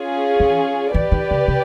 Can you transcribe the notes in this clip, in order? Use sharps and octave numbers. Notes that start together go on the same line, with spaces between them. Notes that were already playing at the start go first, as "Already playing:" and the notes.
Already playing: C#4 F4 G#4
E3
E3 G4 B4 D5
D#3
C#3
C3